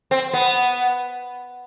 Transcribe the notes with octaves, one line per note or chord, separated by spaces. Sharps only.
C4
B3